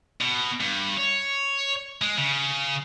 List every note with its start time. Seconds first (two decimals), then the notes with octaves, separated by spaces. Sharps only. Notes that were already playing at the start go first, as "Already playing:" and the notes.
0.21 B2
0.60 G2
0.97 C#5
2.02 G#3
2.18 C#3